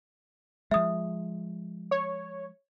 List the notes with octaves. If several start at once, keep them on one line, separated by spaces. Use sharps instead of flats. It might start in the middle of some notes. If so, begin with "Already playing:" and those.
F3 G#3 E5 D#6
C#5